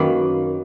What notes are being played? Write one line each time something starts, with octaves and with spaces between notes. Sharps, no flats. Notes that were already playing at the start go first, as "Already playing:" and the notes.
Already playing: F#2 D#3 F#3 A#3 B4 D#5